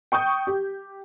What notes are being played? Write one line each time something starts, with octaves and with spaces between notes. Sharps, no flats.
G5 C#6 D#6 G6
G4